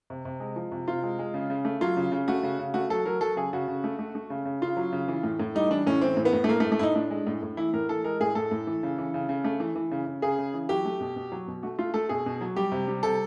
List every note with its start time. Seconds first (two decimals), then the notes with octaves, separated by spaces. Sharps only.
0.10 C3
0.25 C3
0.40 G#3
0.56 F3
0.72 C3
0.88 C3 F4
1.03 G#3
1.19 G#3
1.34 C#3
1.50 C#3
1.65 A3
1.81 F#3 F4
1.97 C#3
2.12 C#3
2.28 A3 F#4
2.43 C#3
2.59 C#3
2.74 A3 F#4
2.90 F#3 A4
3.05 F#3 A#4
3.21 F#3 A4
3.36 C#3 G#4
3.53 C#3 F#4
3.68 C#3
3.84 A3
3.99 A3
4.15 A3
4.30 C#3
4.45 C#3
4.61 C#3 F4
4.77 F#3
4.93 C#3
5.08 E3
5.24 A2
5.40 A2
5.55 G3 D#4
5.70 E3 D4
5.87 A2 C#4
6.01 E3 C4
6.17 A2
6.25 B3
6.33 A2
6.44 A3
6.49 A2 A#3
6.60 A3
6.65 A2
6.72 A3
6.79 A2 D#4 E4
6.95 A2 D4
7.10 G#3
7.27 A2
7.43 A2
7.57 E3 E4
7.73 A2 A#4
7.89 E3 A4
8.04 G#3 A#4
8.20 A2 G#4
8.35 A2 A4
8.51 A2
8.67 E3
8.83 C#3
8.98 E3
9.14 C#3
9.29 C#3
9.44 A3
9.60 E3
9.75 E3
9.91 C#3
10.07 C#3
10.22 C#3 G#4
10.39 C#3
10.54 E3
10.69 F#3 G4
10.85 A3
11.01 B2
11.16 B2
11.32 F#3
11.48 B2
11.63 A3 F#4
11.79 A3 F4
11.94 A3 A4
12.09 B2 G#4
12.26 B2
12.41 F#3
12.56 G3 G4
12.72 C3
12.88 G3
13.03 C3 A4